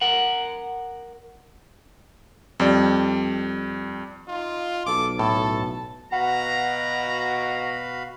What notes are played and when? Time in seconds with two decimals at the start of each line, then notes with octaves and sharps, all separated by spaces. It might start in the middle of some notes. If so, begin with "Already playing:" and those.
0.01 A#4 F#5
2.60 F2 G3 D5
4.28 D#4 F4
4.87 B1 A4 D6
5.19 A2 A4 A5
6.12 B2 F#4 F5 F#5 A#5 B5